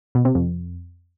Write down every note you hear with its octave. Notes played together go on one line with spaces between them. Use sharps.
B2
C3
F2